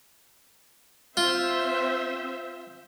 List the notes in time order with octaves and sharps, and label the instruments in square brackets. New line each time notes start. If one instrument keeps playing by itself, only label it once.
[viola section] C4 C5 E5 [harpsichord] F4